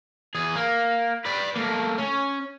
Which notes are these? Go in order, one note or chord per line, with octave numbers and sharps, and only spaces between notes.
E2 G#4
A#3
B4 D5
A3 A#3
C#4